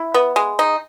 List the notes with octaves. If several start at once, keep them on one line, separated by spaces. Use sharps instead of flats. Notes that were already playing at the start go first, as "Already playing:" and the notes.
Already playing: E4
B3
G#3
D#4